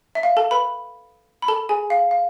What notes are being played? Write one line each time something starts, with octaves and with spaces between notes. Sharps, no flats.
E5
F5
A4 A5
B4 B5
B5
A4 A5
G#4 G#5
F5
F5